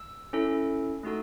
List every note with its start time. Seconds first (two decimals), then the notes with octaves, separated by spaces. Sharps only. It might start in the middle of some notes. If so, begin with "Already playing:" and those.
Already playing: E6
0.33 C#4 E4 A4
1.03 A3 D#4 F#4 A4